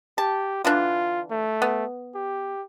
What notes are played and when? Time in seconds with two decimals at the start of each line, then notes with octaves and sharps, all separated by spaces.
0.18 G4 A5
0.65 D3 E3 D4 F4
1.31 A3
1.62 B3
2.15 G4